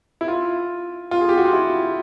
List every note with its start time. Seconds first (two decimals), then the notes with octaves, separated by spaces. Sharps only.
0.21 E4
0.28 F4
1.11 F4
1.21 G#4
1.29 G4
1.37 F#4
1.45 F4
1.53 E4